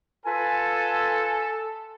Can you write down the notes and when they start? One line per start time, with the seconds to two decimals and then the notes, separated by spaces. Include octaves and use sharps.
0.25 F4 A4 B4 G#5